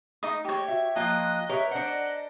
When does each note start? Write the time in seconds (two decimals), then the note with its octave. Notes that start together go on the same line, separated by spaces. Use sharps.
0.23 D#4 D#5 D#6
0.45 G4 C#5 D#5
0.68 F#4 E5
0.96 F3 A#3 F4 D#5 F#6
1.49 G4 A#4 B4 C#5 E5
1.71 D4 C5 D#5 F#5